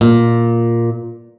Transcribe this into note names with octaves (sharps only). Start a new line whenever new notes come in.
A#2